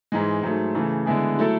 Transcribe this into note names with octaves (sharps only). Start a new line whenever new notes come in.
G#2 E3 G#3
G#2 F#3 A3
C#3 E3 A3
D3 G#3 B3 E4 G#4
F#3 A3 E4 A4